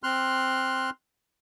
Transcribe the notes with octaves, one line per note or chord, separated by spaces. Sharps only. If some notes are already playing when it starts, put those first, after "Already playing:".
C4 C6 F6 F#6